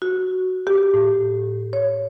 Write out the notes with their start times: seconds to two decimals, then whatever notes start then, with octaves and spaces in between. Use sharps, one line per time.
0.02 F#4
0.67 G4
0.94 A2
1.73 C#5